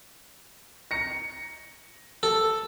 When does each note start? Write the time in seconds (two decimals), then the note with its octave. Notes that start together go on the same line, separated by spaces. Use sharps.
0.91 A#6 C#7
2.23 A4